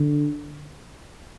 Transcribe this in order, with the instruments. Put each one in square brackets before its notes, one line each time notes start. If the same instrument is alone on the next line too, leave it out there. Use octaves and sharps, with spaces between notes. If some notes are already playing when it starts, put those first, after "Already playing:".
Already playing: [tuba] D3